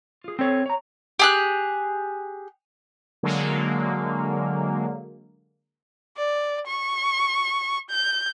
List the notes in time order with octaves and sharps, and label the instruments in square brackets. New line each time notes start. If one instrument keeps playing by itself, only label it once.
[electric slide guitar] F4 G#4
C4 A4 C#5
C#5 A#5
[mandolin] G4 G#4 F#6
[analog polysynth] D3 F#3 G#3 A#3
[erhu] D5
C#6
G6